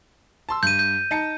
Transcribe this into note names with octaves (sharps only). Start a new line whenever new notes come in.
A5 C6 E6
G2 G6 D#7
G6
D#4 A5 C#7